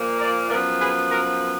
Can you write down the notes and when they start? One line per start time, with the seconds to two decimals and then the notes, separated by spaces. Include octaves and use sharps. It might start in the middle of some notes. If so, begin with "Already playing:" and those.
Already playing: A#2 F3 A#3
0.18 A#4 D5
0.49 F#2 F3 B3 A#4 D5
0.80 G#4 B4
1.10 F#4 A#4